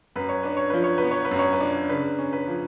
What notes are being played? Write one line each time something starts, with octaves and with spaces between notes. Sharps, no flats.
F#2 B4
C#5
D4 B4
C#5
F3 B4
C#5
B3 B4
C#5
B4
F#2
C#5
B4
D4
C#3 B4
C#4
B4
F3